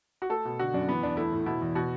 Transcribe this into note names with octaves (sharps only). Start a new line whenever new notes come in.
F#4
A3 A4
B2
D3 F#4
F#2 D4
E3 B3
E2 D4
A3 E4
A2
B2 E4
E2
B2 F#4